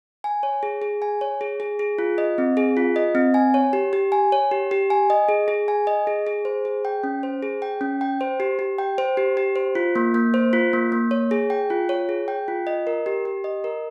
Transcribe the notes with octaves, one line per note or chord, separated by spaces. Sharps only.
G#5
C#5
G#4
G#4
G#5
C#5
G#4
G#4
G#4
F4
D#5
C4
G#4
F4
D#5
C4
G#5
C#5
G4
G4
G#5
C#5
G4
G4
G#5
D#5
G#4
G#4
G#5
D#5
G#4
G#4
C5
G#4
G5
C#4
C5
G#4
G5
C#4
G5
C5
G4
G4
G5
C5
G4
G4
C5
F4
A#3
A#3
C5
F4
A#3
A#3
C#5
G#4
G5
F4
C#5
G#4
G5
F4
D#5
A#4
G4
G4
D#5
A#4